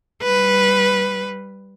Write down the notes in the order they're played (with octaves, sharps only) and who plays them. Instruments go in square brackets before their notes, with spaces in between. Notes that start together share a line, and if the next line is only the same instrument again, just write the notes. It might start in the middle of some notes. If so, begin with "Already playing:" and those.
[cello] G3 B4